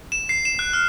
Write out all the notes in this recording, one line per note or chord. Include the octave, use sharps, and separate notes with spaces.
E7
C7
E7
F#6
F6